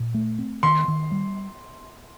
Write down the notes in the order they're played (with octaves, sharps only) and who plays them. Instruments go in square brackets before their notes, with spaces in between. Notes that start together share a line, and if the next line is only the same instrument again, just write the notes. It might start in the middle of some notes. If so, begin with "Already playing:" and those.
Already playing: [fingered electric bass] A#2
A3
C4
[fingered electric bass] D#3 [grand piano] C6
[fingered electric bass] D#3
G3